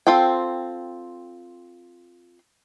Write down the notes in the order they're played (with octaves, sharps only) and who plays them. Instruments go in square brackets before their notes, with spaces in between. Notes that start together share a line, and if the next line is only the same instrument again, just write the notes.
[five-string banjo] C4 F4 A4 G5